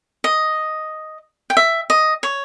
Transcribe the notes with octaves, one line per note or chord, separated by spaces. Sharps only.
D#5
G5
E5
D#5
C#5